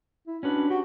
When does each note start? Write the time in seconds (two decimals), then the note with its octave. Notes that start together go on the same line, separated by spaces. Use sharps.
0.28 E4
0.43 C#4 D4 F#4 B4
0.70 F#4 G4